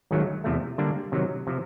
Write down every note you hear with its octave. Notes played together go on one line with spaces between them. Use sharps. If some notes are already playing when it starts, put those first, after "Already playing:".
G#1 G#2 D#3 F#3 A3
E2 C3 F3 A3
D3 G3 A#3 D4
C3 D#3 F#3
C3 F3